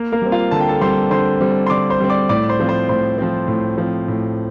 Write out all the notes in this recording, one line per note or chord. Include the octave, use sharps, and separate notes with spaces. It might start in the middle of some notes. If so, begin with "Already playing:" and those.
Already playing: A#3 A#4
A#3 A#4
G3 C4
F4 F5
D3 A5
G5
A4 A5
G3 C4 C5 C6
D3 C5 C6
G3 C4
C6
D3 D5 D6
C5 C6
G3 C4
D5 D6
A2 D5 D6
C5 C6
F3 C4
C5 C6
A2 C5 C6
F3 C4
A2
F3 C4
A2